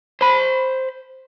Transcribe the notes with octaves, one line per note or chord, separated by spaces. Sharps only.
C5 B5